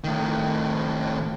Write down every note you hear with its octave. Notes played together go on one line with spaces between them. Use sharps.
A2 D#3